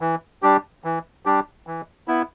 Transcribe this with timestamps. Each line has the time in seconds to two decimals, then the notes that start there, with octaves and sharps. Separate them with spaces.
0.01 E3
0.42 G3 D4 G4
0.84 E3
1.25 G3 D4 G4
1.67 E3
2.08 B3 E4